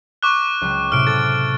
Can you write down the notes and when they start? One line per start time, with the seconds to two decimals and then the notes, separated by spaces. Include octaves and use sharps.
0.23 C#6 D6 F#6
0.61 C#2 F#3 G5
0.92 A2 C3 F6 D7
1.07 A4 A6